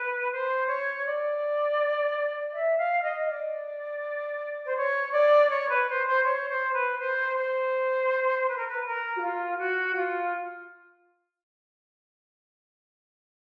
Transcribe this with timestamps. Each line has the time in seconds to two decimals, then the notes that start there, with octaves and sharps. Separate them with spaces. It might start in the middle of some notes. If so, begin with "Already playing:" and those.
Already playing: B4
0.32 C5
0.68 C#5
1.05 D5
2.54 E5
2.78 F5
3.03 D#5
3.29 D5
4.65 C5
4.76 C#5
5.13 D5
5.50 C#5
5.70 B4
5.88 C5
6.07 C5
6.25 C#5
6.50 C5
6.74 B4
6.99 C5
7.36 C5
8.48 B4
8.58 A#4
8.68 B4
8.85 A#4
9.17 F#4
9.21 F4
9.58 F#4
9.95 F4